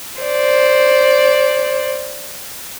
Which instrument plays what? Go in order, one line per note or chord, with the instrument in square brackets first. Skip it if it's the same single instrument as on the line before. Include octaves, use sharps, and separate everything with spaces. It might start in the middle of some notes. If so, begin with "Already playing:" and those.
[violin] C5 D5